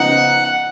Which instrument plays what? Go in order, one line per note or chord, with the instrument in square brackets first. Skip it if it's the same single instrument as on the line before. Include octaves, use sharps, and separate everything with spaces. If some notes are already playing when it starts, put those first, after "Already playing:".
Already playing: [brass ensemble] C#3 F3 B3 D#4 [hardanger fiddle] F#5